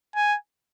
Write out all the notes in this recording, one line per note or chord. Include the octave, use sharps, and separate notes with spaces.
G#5